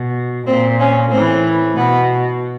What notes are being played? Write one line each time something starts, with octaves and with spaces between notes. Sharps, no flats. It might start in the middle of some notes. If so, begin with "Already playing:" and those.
Already playing: B2
A#2 C4
C#4
A2 E3 C4
B2 B3